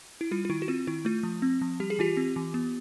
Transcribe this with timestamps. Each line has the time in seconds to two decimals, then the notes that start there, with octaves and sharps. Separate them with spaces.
0.21 E4
0.31 G3 F4
0.45 F4
0.49 D#3 E4
0.62 F#4
0.68 C4 F4
0.87 D#3 E4
1.05 A3 F4
1.23 F3
1.42 C4
1.61 F3
1.80 G3 G4
1.90 G#4
1.99 E3 F4 G4
2.17 C4
2.36 E3
2.54 B3